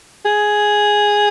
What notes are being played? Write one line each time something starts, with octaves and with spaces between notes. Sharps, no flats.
G#4